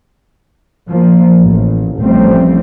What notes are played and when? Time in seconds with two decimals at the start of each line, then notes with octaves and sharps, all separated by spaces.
0.90 F3 A#3
1.42 A1
2.00 A1 F3 G3 A3 C4